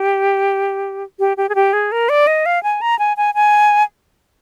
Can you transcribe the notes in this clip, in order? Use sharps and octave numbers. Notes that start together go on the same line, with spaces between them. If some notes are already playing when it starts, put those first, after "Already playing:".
Already playing: G4
G4
G4
G#4
G4
G#4
A#4
D5
D#5
F5
G#5
A#5
G#5
G#5
G#5